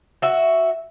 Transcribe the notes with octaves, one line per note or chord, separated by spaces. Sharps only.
F#4 E5